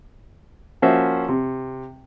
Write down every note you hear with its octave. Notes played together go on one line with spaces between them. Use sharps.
F3 A#3 C#4 F#4 C5 E5
C3